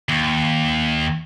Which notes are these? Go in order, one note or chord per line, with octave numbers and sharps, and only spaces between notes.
D#2